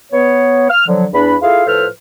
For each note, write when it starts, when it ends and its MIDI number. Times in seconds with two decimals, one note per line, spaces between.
0.12 0.66 59
0.12 0.66 73
0.70 0.84 89
0.87 1.06 50
0.87 1.06 53
0.87 1.06 54
1.13 1.36 40
1.13 1.36 62
1.13 1.36 83
1.42 1.65 64
1.42 1.65 65
1.42 1.65 68
1.42 1.65 69
1.42 1.65 77
1.66 1.86 45
1.66 1.86 53
1.66 1.86 69
1.66 1.86 71
1.66 1.86 72
1.66 1.86 89